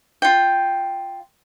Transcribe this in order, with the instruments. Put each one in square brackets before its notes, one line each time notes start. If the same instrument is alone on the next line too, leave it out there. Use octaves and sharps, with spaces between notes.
[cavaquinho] F4 G5